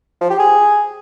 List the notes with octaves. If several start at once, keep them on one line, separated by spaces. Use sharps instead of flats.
F3
G4
G#4